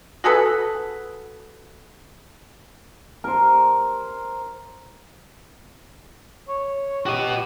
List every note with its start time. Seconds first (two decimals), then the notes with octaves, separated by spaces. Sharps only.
0.24 F#4 G#4 A4 B4
3.24 A#4 C5
6.49 C#5
7.06 F#4 G4 D#5